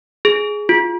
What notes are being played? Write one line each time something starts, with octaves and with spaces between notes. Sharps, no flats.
G#4
F4